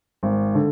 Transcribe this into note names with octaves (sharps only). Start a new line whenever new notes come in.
G#1
D3